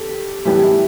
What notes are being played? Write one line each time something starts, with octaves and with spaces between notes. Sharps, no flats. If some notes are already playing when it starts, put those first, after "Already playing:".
Already playing: G4 A4
A2 E3 G3 B3 G4
E4